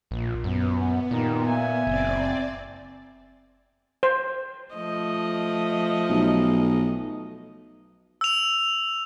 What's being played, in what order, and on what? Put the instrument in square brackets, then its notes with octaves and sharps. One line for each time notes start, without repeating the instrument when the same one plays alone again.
[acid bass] A#1 [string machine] A#2
[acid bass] F#2 [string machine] B3
[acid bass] A#2 [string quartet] D#3 G4
[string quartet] E5 G#5
[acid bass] F#1 [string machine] C4 D5 A6
[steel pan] C5
[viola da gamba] F3 A3 D#5
[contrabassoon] B1
[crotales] E6 F7